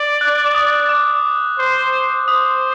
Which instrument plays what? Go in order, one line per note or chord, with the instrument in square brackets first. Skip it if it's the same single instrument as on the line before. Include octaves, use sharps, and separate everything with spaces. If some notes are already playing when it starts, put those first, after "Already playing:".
Already playing: [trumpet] D5
[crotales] F#6
D6
D#6
D6
[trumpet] C5
[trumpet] C5 [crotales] D#6